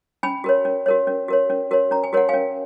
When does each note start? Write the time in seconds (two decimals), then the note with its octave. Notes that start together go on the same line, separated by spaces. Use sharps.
0.23 C#4 G#5 B5
0.44 F#4 A#4 C#5
0.65 C#4
0.86 F#4 A#4 C#5
1.07 C#4
1.28 F#4 A#4 C#5
1.50 C#4
1.71 F#4 A#4 C#5
1.91 C#4 A#5
2.03 G#5
2.13 F#4 A#4 C#5 F#5
2.29 C#4 F5 G#5